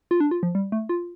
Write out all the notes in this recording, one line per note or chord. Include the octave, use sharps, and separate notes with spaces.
F4
D4
F4
F3
G3
A3
F4